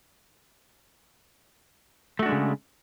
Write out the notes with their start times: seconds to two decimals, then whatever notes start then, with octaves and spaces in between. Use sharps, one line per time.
2.19 A3
2.22 F#4
2.26 D4
2.29 G#3
2.32 C#3